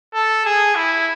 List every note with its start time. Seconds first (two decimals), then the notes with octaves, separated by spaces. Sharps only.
0.14 A4
0.46 G#4
0.75 E4